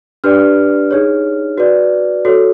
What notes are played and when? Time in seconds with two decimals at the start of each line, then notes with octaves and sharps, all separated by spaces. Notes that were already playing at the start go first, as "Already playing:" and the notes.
0.24 D4 G4 B4 D5 F6
0.91 D#4 G#4 C#5
1.58 F#4 B4 D5
2.25 F#4 A4 C#5